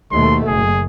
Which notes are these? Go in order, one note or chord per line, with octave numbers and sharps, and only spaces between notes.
D#2 B2 A3 C6
F#1 G#4